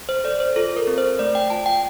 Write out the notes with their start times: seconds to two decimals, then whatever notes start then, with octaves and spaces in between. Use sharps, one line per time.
0.09 C5
0.24 A4 D5
0.40 C5
0.56 F4 A4
0.77 A#4
0.87 C4
0.98 C5
1.19 A3 D5
1.35 G5
1.50 F4 A5
1.66 G5